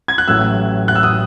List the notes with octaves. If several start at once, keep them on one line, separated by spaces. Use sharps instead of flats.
G#6
F#6
A1 A2 F#3 E6
F#6
E6
D#6